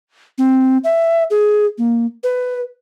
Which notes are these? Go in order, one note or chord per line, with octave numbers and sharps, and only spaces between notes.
C4
E5
G#4
A#3
B4